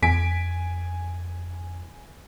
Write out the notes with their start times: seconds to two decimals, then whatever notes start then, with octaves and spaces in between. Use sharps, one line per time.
0.02 F2 G#5 B6 D7